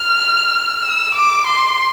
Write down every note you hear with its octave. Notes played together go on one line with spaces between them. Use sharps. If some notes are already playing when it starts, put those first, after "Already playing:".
Already playing: F6
E6
D6
C6